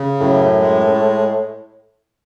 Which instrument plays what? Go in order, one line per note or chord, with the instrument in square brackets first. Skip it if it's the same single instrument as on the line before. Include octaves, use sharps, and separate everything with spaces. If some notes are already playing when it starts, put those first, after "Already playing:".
Already playing: [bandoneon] C#3
[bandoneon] F#2 [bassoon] A2
[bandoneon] G#3